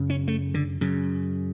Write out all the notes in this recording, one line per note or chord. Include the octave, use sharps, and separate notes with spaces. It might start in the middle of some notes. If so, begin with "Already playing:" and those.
Already playing: F#2 C#3
C#4
A3
D3
F#2 C#3